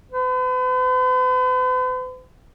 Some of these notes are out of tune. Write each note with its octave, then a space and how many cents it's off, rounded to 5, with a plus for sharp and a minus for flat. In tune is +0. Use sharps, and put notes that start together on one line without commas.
B4 +45